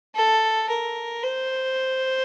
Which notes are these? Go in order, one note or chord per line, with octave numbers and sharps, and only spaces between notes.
A4
A#4
C5